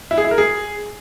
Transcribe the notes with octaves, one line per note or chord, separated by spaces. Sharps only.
E4
G#4
E4
A#4
G#4